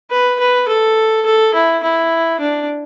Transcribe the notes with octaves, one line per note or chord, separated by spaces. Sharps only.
B4
B4
A4
A4
E4
E4
D4